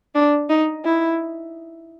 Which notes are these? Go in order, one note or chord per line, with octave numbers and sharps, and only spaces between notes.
D4
D#4
E4